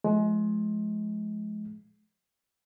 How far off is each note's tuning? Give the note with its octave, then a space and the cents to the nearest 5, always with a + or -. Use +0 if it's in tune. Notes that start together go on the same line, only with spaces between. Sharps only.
F3 +0 G#3 +30